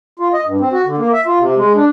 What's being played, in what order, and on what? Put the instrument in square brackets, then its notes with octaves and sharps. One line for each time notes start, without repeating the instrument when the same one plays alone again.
[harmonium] F4
D#5
G2
C4
F#4
D3
A#3
E5
F4
C3
G#3
D4